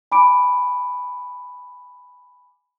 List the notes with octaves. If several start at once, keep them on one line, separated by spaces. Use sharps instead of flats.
G#5 B5 D6 D7